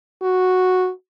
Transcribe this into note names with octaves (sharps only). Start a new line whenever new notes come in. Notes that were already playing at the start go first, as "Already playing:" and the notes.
F#4